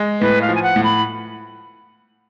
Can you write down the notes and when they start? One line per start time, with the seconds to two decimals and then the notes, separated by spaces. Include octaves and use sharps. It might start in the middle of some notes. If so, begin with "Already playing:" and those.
Already playing: G#3
0.21 A2 B4
0.42 F5
0.49 F3
0.55 G#5
0.63 F#5
0.76 A2
0.84 B5